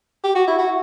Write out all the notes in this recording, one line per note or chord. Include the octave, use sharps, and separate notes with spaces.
G4
F#4
E4
F#4